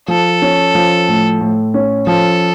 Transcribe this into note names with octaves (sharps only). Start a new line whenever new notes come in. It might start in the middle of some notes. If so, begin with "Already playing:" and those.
F3 A4
C#4
F3
A2
A2
C#4
F3 A4